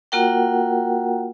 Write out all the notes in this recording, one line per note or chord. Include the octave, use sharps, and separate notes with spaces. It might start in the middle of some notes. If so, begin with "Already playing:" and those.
A#3 F4 F#4 A#4 F#5 G5